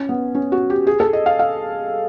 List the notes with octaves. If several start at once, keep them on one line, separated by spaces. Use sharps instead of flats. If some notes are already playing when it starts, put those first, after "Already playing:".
Already playing: C#4
B3
C#4
F#4
G4
G#4
A4
D#5
F5
F5